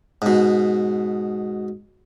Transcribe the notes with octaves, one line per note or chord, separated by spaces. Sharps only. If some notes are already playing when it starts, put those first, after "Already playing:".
G#2 B2